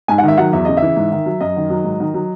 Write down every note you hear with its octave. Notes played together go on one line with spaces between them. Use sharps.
G#2 G#5
F#5
D#3 E5
F#3 F#5
E2 E5
C#3 D#5
E5
E3
G#2
D#3
F#3
F#2 D#5
D#3
F#3
G#2
D#3
F#3